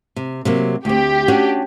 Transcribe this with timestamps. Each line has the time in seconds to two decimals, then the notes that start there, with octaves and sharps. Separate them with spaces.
0.16 C3
0.45 C3 F#3 A#3
0.85 D2 C4 G4
1.28 C#4 D4 F#4